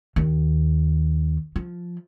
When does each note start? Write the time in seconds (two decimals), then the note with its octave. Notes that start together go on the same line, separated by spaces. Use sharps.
0.16 D#2
1.56 F3